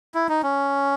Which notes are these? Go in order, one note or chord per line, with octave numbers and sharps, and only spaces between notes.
E4
D#4
C#4